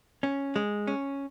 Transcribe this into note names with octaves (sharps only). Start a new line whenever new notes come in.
C#4
G#3
C#4